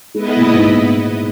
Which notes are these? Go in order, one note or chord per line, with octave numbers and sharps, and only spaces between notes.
G#3 B3 E4 B4 D#5
G#3
B2
A#2
G#2